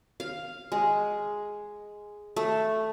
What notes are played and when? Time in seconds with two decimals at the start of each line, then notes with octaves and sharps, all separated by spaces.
0.20 F5
0.72 G#3
2.36 A3